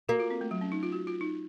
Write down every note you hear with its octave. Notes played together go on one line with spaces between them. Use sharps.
A#3 F#4
F4
C4
A3
F#3
C#4
D#4
F4
F#4
F4
D#4